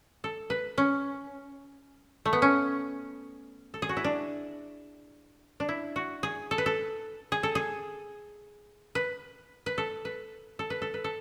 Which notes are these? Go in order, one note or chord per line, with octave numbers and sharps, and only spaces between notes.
A4
B4
C#4
A3
B3
C#4
A4
G#4
F#4
E4
D4
D4
E4
F#4
G#4
A4
B4
A4
G#4
A4
G#4
B4
B4
A4
B4
A4
B4
A4
B4
A4